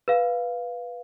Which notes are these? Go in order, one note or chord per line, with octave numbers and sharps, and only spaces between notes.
B4 F5